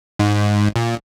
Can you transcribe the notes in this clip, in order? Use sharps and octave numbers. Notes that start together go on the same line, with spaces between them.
G#2
A#2